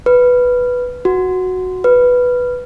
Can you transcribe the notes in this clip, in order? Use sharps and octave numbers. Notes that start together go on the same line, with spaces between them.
B4
F#4
B4